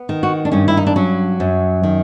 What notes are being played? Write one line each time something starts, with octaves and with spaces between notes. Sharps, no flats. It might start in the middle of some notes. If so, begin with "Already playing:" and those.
Already playing: B3
D#3
F#4
D4
G2 C#4
E4
D#4
D4
F#3 C#4
F#2
D#3